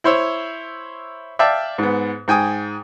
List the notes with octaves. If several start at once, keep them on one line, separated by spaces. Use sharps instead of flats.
E4 C5 C#5 E6
D5 E5 F5 G5 A5
G#2 B3
G#2 G5 G#5 D#6